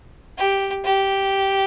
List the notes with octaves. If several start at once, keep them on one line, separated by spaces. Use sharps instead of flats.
G4
G4